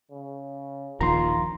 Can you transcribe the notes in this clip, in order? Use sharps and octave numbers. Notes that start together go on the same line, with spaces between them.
C#3
D#1 A#1 D#3 F4 A#5 C6